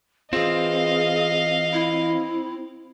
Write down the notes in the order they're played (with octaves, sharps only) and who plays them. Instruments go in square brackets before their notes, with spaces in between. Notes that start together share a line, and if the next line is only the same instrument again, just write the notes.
[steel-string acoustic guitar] E3 F4 [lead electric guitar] C4 [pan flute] G#4 [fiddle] D#5 F5
[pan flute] E4